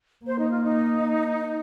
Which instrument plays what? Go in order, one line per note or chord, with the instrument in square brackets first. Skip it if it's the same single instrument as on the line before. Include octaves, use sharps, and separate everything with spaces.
[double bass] A#3 [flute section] C5
[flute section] D#4
F4
D#4